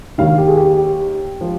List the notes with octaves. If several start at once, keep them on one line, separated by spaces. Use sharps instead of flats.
D#2 D#3 F5
G4
G#4
G4
G4
F3